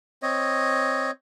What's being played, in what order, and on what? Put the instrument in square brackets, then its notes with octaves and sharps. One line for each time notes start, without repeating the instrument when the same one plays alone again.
[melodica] C4 C#5 D#5